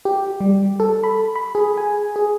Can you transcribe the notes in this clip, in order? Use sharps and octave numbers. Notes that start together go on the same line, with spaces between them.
G4
G3
A4
B5
B5
G#4
G#5
G#4